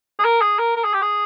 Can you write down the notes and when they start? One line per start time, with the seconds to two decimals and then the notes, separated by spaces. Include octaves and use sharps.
0.19 G#4
0.25 A#4
0.42 G#4
0.59 A#4
0.76 A#4
0.84 G#4
0.94 G4
1.02 G#4